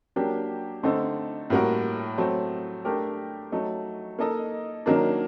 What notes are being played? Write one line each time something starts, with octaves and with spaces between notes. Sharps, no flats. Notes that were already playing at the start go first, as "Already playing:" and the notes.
F#3 A#3 D4 G4
D3 A3 C4 D#4 A4
A2 G3 A#3 F#4 A#4
F#3 A3 C4
A3 D4 G4 A#4
F#3 A3 D#4
A#3 D#4 A4 D#5
D#3 F#3 A#3 D4